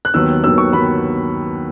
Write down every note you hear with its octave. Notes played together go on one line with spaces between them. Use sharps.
F#6
D#2 D#3 F#3 B3 E6
D#2 D#3 F#3 B3 E6
C#6
D#3 F#3 B3 B5